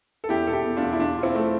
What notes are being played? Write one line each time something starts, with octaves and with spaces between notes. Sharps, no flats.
A4
E2 E4 G4
B2 A4
E4 G4
B2
D4 F4
E2
E4
E2 D4 F4
B2 F4
C4 E4
B2 A3